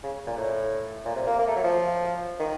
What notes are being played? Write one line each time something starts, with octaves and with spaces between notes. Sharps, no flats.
C#3
A#2
A2
A#2
C3
A#3
A#3
A3
F#3
F3
D#3